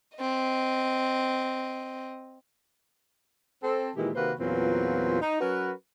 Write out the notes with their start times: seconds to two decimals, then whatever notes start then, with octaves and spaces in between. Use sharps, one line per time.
0.18 C4 D#5
3.63 C4 A4
3.96 A#2 D#3 E3 G#3 E4 G4
4.15 C3 D#3 A#3 F#4 B4 C5
4.39 E2 A#2 F#3 C4 F4 B4
5.22 D#4
5.40 F#3 C#4 F#4 A#4 B4